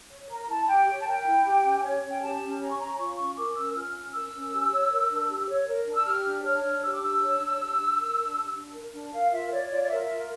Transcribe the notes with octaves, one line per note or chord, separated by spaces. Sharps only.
C#5
A#4 A#5
E4 A5
G4 G5
C#5
A5
A#4 G5
E4
G4
C#4
C#5
C#4
G5
G4 A5
C#4
C#5 A#5
C#6
C#4 A#5
F4 C#6
C#4 C#6
A#4 D6
C#4 E6
F4 F6
C#4
A#4 E6
C#4
G4
C#5
A#4
D4
G4
C#5
A#4
D4
E6
G4 F6
D4
C#5 F6
D4
G4 E6
D6
D4 E6
C#5
D4
G4
D4
A#4
D4
G4
D4
A#4
D4
A#4 F5
F4 E5
C#5 D5
F4 D5
D5
A#4 E5
F4